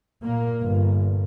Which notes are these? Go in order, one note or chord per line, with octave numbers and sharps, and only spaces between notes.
A#2 A#3
G1